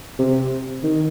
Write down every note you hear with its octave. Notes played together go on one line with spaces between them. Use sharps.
C3
D#3